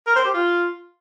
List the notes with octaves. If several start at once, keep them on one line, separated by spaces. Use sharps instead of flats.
A#4
C5
G4
F4